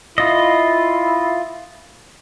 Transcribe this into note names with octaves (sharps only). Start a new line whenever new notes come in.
E4 F4 D#5